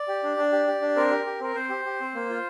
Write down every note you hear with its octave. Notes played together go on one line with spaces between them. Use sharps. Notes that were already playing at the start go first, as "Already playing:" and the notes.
Already playing: D5
G4
D4
D4
G4
G4
D4
C4 A#4
G4
G4
C4 A#4
C4 C5
G4
G4
C4
A#3
F4